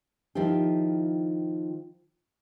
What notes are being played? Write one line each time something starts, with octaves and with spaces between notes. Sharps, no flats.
D#3 F3 E4 F4 G4